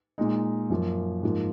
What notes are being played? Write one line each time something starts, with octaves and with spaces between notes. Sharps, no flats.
A#2 G#3 D#4
F#2 F3 A#3
G#2 F3 A#3